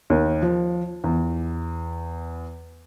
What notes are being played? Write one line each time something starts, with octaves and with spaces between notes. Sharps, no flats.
D#2
F3
E2